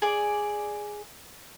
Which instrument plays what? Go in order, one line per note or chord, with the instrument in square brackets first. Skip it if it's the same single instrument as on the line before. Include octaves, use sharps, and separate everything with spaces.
[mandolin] G#4 D5